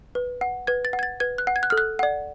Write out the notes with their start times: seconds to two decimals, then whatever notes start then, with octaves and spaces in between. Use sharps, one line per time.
0.15 B4
0.41 F#5
0.67 B4 G#6
0.85 A6
0.93 F#5
0.99 G#6
1.03 A6
1.20 B4 G#6
1.38 F#6
1.47 F#5
1.56 G#6
1.63 F#6
1.70 A4 F6
1.78 F#6
1.99 D5 F#5